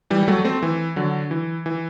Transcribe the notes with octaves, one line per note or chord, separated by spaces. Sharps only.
E3 G3
G3
F#3 A3
A3 C4
E3
D3 F#3
E3
E3